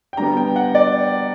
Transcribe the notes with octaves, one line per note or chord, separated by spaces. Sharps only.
G5
D3 G3 B3 A#5
G5
F#5
D5